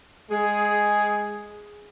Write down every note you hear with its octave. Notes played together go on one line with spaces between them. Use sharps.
G#3 G#4